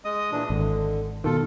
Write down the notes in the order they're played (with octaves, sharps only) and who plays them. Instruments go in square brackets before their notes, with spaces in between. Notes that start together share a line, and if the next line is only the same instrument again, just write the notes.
[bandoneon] G#3 D#5 D#6
A#2 E3 D4
[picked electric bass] G#1 [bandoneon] D3
[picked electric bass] B2 D#3 [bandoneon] F4 A4